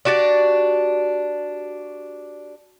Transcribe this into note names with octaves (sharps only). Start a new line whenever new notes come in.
D4 F#4 G4 D5